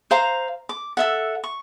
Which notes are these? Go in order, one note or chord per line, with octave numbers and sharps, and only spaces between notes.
C5 F5 A#5
D6
A4 E5 F#5
C#6